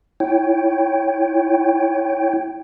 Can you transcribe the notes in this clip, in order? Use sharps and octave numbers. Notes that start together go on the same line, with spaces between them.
E4 C#5 G5